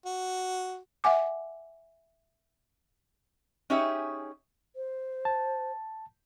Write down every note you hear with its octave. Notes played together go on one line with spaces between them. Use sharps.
F#4
E5 F#5 G#5 D6
C#4 D#4 G4 G#4 C#5 E5
C5
A5